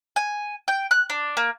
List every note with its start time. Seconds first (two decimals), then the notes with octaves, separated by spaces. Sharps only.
0.16 G#5
0.68 G5
0.91 F#6
1.10 D4
1.37 A#3